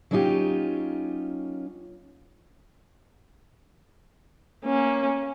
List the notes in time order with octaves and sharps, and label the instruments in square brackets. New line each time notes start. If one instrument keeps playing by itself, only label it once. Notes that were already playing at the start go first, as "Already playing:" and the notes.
[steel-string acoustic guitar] F#3 A#3 C#4 D#4 F4 G4
[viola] A#3 C#4